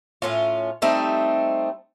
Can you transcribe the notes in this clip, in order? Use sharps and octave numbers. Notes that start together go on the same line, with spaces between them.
A2 C#4 F4
G3 A3 C4 D#4